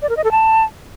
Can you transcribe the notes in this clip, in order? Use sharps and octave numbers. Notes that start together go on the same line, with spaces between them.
D5
A#4
D#5
A4
A5